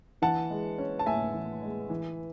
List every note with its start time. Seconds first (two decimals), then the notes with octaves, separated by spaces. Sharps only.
0.22 E3 F#5 A5
0.50 G#3
0.78 C#4
0.99 A5
1.06 A2 E5 G#5
1.34 E3
1.62 G#3
1.90 E3